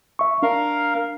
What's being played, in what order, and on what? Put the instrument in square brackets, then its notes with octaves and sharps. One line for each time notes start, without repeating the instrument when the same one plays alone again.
[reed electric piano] E5 C#6
[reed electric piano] D4 [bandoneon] A#4 F5